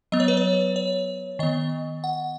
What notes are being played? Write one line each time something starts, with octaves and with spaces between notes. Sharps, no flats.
F#3 B3 D#5
C#5
B4
C#5
C#5
D#3 B3 D#5
F#5